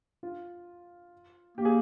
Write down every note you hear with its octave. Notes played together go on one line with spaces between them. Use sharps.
F4
A#3 G4
G#4